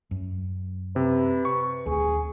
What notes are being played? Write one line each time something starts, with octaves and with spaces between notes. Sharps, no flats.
F#2
C3 B4
C#6
D#1 D2 G#4